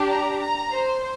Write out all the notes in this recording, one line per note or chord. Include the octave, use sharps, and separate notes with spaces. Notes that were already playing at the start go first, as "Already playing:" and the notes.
Already playing: D4 G4
A#5
A#5
C5